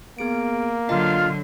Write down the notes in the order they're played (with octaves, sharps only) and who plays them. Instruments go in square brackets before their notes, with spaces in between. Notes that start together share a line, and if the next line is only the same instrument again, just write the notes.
[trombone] A#3 [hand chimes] B3 G#4 D7
[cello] D3 F#3 [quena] F4 [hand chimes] D#5 A5